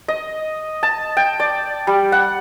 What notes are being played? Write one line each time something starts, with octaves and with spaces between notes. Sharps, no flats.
D#5
A5
G5
D5
G3
F#5